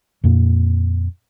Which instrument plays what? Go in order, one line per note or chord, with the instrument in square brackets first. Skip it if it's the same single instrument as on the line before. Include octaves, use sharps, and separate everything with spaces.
[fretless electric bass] F2 A#2 A#3